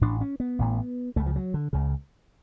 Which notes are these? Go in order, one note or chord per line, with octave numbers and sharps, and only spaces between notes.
A1 A2 D4
C#4
B3
A1 A2
C#2 C#3 A3
F3
F#3
D3
C#2 C#3